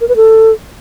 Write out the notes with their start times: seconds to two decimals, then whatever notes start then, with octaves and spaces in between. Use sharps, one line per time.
0.01 A#4
0.08 B4
0.16 A4